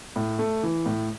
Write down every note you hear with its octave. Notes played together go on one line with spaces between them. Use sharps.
A2
A3
E3
A2